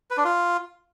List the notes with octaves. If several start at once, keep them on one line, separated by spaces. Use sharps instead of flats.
B4
D4
F4